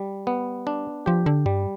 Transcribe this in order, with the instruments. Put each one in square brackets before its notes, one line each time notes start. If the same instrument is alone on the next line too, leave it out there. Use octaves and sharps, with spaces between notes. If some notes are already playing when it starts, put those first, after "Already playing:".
Already playing: [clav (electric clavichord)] G3
B3
D4
[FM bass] F3 [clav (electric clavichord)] G4
[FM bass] D3
[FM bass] G2 [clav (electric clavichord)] G3